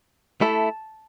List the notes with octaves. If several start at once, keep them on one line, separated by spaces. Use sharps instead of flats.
A3 E4 A4 A5